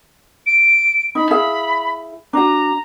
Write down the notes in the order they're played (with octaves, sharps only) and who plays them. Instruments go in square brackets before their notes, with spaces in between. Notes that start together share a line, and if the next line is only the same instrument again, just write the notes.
[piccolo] D7
[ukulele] D#4 [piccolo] B5
[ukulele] E4 G#4 F5
[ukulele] D4 F#4 [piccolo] A#5